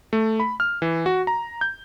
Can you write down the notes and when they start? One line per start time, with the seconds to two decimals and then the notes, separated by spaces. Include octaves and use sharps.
0.13 A3
0.40 B5
0.60 F6
0.82 E3
1.06 F#4
1.27 A#5
1.61 G6